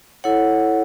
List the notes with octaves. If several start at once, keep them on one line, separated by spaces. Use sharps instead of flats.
E4 A4 C#5 F#5